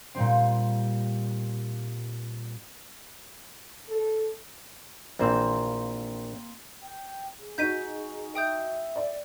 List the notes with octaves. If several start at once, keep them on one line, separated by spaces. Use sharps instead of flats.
A#2 G3 C4
A4
A#1 E3 A#3 C4
G5
G#4
D#4 F#4 G#4 G6 B6 D#7
E5 G5 D#6 G6
D5